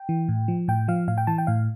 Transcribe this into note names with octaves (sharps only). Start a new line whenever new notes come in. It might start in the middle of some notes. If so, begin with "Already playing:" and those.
Already playing: G5
E3
A2
F3
A2 G5
F3 F5
A2 F5
G5
E3 A5
G5
A2 F5